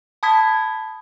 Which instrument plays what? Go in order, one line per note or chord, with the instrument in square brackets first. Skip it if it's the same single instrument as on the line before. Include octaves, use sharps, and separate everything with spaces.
[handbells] A5 B5 D#6 G#6 B6